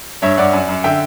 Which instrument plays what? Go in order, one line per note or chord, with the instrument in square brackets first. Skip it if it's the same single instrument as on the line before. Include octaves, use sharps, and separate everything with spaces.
[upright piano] G2 C#5 E5
G2 D5 F#5
F#2
F#2
D3 E5 G5